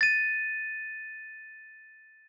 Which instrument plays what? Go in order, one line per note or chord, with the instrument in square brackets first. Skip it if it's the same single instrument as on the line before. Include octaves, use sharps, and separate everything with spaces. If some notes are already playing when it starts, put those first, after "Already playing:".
[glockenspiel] A6 D#7